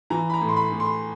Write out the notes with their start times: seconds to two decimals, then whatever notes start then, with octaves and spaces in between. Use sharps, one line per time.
0.10 E3 A#5
0.30 B5
0.34 A#5
0.41 A2
0.49 C6
0.56 B5
0.72 A2
0.80 C6